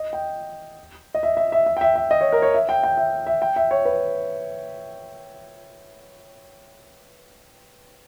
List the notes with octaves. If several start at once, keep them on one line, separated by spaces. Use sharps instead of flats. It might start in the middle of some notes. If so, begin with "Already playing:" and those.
Already playing: D#5
G5
D#5
E5
E5
E5
E5
G5
E5
E5
D#5
C#5
A#4
C#5
E5
G5
G5
E5
E5
G5
E5
C#5
B4